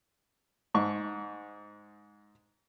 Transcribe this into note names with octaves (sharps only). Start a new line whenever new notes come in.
G#2 C#6